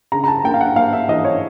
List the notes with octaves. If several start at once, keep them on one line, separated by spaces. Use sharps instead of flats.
C#3 A#5
A#5
A5
A#3 G5
F5
F#5
A#3 F5
E5
E3 D#5
C#5